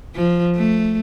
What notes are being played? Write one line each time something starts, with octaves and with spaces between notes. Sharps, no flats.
F3
A3